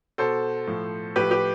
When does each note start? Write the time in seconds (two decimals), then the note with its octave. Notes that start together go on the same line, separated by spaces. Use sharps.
0.18 B2 A4 C5
0.67 A2 F3
1.16 A2 F3 G4 B4
1.31 G4 B4